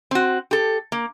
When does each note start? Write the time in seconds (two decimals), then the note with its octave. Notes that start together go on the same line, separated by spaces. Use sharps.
0.11 C4 F#4
0.51 G4 A4
0.92 A#3